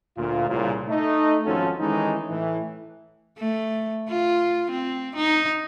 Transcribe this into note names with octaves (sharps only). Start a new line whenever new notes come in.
D2 A#2 F4
C2 A#2 C#3
A3 D#4
G#1 F3 C#4 F#4 A4
D#3 E3 G#3 A3 C#4 D#4
A2 E3
A3
F4
C4
D#4